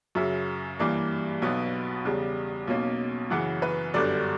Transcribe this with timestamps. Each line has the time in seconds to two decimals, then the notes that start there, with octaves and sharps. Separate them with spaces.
0.15 F#2 C#3 F#3 E5
0.79 G2 E3 G3 A#3
1.42 B1 B2 F#3 B3
2.05 E2 C#3 G3
2.67 B1 B2 A#3 C#4
3.30 F#2 C#3 E3 F#5
3.62 B4
3.94 G1 F#2 D3 G3 D5